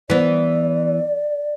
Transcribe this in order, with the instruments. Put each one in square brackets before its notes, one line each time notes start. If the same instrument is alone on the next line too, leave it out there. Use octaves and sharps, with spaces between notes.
[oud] E3 B3 [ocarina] D5